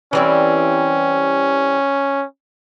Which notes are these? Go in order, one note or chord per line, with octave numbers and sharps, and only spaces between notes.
E3 G3 C4 C#4